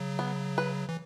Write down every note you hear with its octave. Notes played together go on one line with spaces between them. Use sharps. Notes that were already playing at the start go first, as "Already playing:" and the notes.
Already playing: C#3 F#3
B3
B4
E3